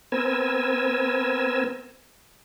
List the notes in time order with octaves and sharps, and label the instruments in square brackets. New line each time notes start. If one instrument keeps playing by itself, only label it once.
[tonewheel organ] B3 C4 A#4 G#5 E6